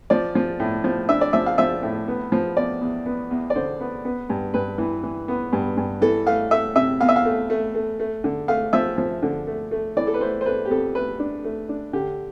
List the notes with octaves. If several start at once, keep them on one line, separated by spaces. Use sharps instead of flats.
F3 D5
F3
A2
F3
D4 E5
D5
F3 E5
F5
F3 E5
A2
B3
F3
E2 D5
E2
B3
E2
D5
D3 C5
B3
B3
G2
G2 B4
E3
E3
B3
G2
G2
E3 A4
A3 F5
A3 E5
C3 E5
E2 F5
E5
F5
A3
A3
A3
A3
D3
A3 F5
F3 E5
F3
D3
A3
A3
E3 D5
A4
B4
A3 C5
C5
A3 B4
G4
F2 A4
A3 B4
D4
A3
D4
D3 G4